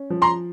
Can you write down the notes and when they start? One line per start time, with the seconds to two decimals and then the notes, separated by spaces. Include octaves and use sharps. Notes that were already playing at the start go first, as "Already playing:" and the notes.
Already playing: C#4
0.10 F3
0.22 A#5 C6